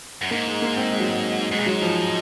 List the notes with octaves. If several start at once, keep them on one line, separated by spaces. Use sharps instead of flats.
F#2
G#2 A#3
G#3
A#3
C4
G#3
F#3
G#3
G#2 G#3
A#2
G#2 F#3
F3
F3